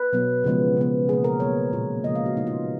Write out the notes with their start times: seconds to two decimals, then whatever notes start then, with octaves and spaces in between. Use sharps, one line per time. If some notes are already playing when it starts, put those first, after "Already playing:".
Already playing: B4
0.13 B2 F#3 B3
0.44 C#3 F3 G#3 B3
0.77 C#3 G#3 B3
1.08 B2 A#3 G#4
1.24 A#4
1.40 B2 F#3 A#3 C#5
1.72 A#2 G#3 B3
2.04 C#3 F3 G#3 D#5
2.15 F5
2.26 F#4
2.37 C#3 G#3 B3 D#4
2.47 F4